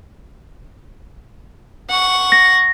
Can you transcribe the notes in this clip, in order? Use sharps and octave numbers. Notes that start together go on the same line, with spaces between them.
F#5 C#6
A#6